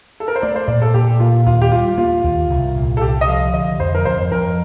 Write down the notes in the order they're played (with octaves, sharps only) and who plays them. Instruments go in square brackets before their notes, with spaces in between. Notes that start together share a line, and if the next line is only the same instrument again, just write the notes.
[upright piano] A4
A#4
C5
[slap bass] A3 [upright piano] D5
[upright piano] C5
[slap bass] A#2 [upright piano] D5
[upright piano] A4
[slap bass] A#2 [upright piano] G4
[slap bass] A#2 [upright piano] F4
[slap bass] D#2 [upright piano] F4
[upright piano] G4
[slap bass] G3 [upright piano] F4
[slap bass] A#3 [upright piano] F4
[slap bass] D#2
C2
A#2
[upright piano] A4
[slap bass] C2 [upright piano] G4
[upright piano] D#5
[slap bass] F3 [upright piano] F5
[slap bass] D3 [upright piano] D#5
[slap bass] F2 [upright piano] C5
[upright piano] A#4
[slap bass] F2 [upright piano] C5
[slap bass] F2 [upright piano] A#4